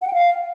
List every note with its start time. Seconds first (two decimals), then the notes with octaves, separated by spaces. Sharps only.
0.02 F#5
0.07 G5
0.13 F5